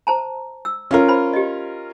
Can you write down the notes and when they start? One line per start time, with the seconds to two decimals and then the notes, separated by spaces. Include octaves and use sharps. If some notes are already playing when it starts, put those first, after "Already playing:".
0.07 C5 A5 A#5
0.65 E6
0.91 C#4 F4 A#4
1.08 C5 B5
1.33 G4 D#5